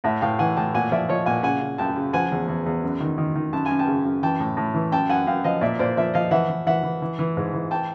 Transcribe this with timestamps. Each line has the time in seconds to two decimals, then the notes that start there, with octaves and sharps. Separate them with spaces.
0.04 A2 E5 F#5
0.21 A2 F5 G5
0.39 E3 F#5 G#5
0.57 A2 G5 A5
0.74 A#2 F#5 G#5
0.92 F3 D5 E5
1.09 F3 C#5 D#5
1.26 A#2 F#5 G#5
1.43 C#3 F#5 G#5
1.61 C#3
1.78 F#2 G5 A5
1.96 C#3
2.13 F3 F#5 G#5
2.32 E2
2.48 E2
2.66 E2
2.84 F#2
3.01 D#3
3.18 D#3
3.36 D#3
3.53 F#2 A5
3.66 F#2 G#5
3.79 G5 A5
3.87 C#3
4.05 F#2
4.23 E3 G5 A5
4.40 A2
4.57 A2
4.74 E3
4.92 F#2 G5 A5
5.10 F#2 F#5 G#5
5.27 F#2 F5 G5
5.44 F3 D#5 F5
5.61 A#2 D5 E5
5.79 A#2 C5 D5
5.97 F3 D5 E5
6.14 F3 D#5 F5
6.31 E3 E5 F#5
6.49 E3
6.66 E3 E5 F#5
6.83 E3
7.02 E3
7.19 E3
7.37 G#2
7.53 E3
7.71 G5 A5